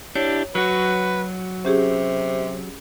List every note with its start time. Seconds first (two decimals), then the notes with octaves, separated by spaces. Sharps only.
0.15 D4 E4 G4 C#5
0.55 F#3 F#4 B4
1.65 C3 C#4 G4 G#4